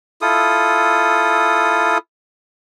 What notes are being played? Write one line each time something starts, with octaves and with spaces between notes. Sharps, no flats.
E4 F4 A4 D#6